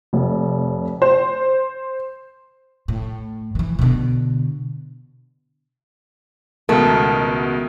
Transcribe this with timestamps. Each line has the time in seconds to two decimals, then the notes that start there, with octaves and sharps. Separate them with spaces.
0.13 F1
1.02 C5
2.88 A2
3.55 D#3 E3
3.79 B2 D3
6.69 C#2 B2 D#3 G#3 A3 B3 A#4